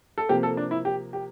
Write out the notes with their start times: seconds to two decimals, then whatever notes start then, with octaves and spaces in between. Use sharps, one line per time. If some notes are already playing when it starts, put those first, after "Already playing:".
0.18 A4
0.29 C3 F3 A#3 G4
0.43 A4
0.57 D4
0.71 E4
0.85 G4
1.13 G4